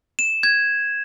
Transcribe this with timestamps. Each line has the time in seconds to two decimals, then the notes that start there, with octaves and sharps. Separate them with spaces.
0.19 E7
0.43 G#6